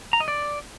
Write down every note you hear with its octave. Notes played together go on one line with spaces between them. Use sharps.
A#5
D#5
D5